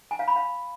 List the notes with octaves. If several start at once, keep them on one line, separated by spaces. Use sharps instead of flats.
G#5
F5
B5
F5